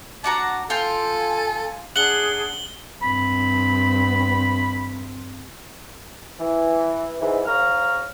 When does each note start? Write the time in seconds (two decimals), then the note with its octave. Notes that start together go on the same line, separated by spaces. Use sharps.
0.24 D4 F#4 A5 A#5
0.70 F4 A4 G5 G#5
1.96 D4 G#4 F#5 F#7 G7
3.02 G2 C4 B5
6.39 E3
7.21 G#2 E3
7.46 G#2 C#5 F5 A#5 F6